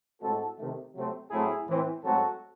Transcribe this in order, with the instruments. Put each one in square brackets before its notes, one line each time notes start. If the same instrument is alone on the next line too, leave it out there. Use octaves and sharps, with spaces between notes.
[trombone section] A2 G#3 C4 F#4 A4
C3 D#3 A3
C3 F#3 A3 C4
A2 F#3 A3 C4 E4 G#4
A2 E3 C4
G#2 F#3 A3 C4 F#4 A4